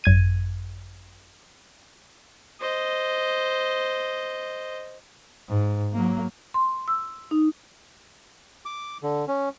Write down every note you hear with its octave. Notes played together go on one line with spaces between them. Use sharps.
G#1 F#2 G#6 D#7
C5 D#5
G#2
F#3 A#3
C6
E6
D#4
D6
D3
C#4